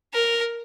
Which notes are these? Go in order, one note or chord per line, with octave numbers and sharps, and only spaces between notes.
A#4